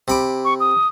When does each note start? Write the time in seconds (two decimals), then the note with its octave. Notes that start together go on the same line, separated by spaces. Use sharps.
0.08 C3 B5 D6
0.45 C#6
0.60 D#6